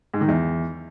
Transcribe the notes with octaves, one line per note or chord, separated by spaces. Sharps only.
G#2
D#3
E2